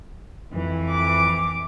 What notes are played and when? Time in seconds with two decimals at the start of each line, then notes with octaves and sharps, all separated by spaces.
0.52 F2 E3
0.90 D6